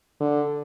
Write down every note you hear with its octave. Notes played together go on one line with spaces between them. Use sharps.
D3